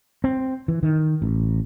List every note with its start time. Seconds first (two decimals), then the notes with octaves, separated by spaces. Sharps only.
0.24 C4
0.68 E3
0.83 D#3
1.22 A1